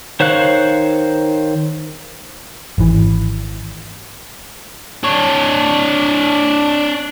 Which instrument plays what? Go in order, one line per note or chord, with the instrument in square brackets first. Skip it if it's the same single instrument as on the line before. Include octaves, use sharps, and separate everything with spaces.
[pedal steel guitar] D#3 C5 C#5 F5 F#6
[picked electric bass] G#1 E3
[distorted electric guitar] D4 C#5